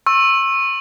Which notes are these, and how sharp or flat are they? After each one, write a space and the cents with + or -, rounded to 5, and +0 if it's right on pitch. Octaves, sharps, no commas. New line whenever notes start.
C#6 -35 E6 +0